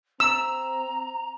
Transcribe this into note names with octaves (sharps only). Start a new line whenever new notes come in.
C4 A#5 E6